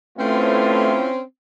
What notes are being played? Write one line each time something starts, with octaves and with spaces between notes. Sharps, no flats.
A2 A3 C4 C#4 E4 F4 B4